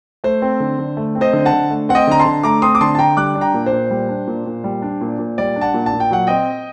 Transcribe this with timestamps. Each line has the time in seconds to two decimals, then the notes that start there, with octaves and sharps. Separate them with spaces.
0.24 A3 C5
0.42 C4
0.60 D3
0.79 D3
0.97 A3
1.15 C4
1.21 C5 D#5
1.33 D3
1.45 F#5 A5
1.53 D3
1.70 A3
1.89 C4 F#5
1.95 D#5 G5
2.07 D3 A#5
2.20 A5 C6
2.25 D3
2.43 A3 A#5 D6
2.62 C4 C6 D#6
2.75 D6
2.81 D3 A5 C6
2.95 A5
2.99 D3 G5 A#5
3.17 G3 D6 F#6
3.35 D4
3.41 G5 A#5
3.54 A#2
3.66 C5
3.72 A#2
3.90 G3
4.09 D4
4.27 A#2
4.46 A#2
4.64 G3
4.82 D4
5.01 A#2
5.19 A#2
5.38 G3 D5
5.56 D4
5.61 F#5 A5
5.74 A#2
5.86 A5
5.93 A#2
6.00 G5
6.11 F#3 F#5
6.27 C4 D#5 G5